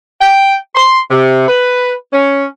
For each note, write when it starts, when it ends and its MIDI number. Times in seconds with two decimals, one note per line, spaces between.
0.21 0.55 79
0.75 1.00 84
1.10 1.46 48
1.47 1.92 71
2.13 2.45 61